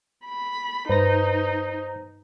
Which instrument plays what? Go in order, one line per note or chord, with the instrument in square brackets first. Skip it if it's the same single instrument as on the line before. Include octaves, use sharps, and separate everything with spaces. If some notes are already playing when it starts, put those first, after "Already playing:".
[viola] B5
[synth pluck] G2 B4 A#6 [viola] D#4 [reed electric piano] C5